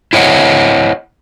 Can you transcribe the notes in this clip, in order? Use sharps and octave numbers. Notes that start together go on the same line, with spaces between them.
E4 C5 C#5 D#5 F#5